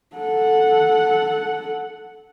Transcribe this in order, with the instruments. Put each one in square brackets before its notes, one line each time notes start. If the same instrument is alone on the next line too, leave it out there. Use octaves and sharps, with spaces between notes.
[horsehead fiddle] A4 F#5